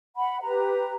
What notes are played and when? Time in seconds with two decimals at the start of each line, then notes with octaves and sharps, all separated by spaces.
0.17 F#5 B5
0.42 G4 B4 A#5